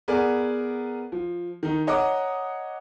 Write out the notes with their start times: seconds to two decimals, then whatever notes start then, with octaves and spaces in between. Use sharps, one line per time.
0.08 B3 G#4 A#4 D5
1.12 F3
1.63 D#3 D#4
1.87 C#5 D#5 F#5 A#5 D6 D#6